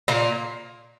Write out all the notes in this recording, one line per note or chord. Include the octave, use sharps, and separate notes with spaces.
A#2 A#3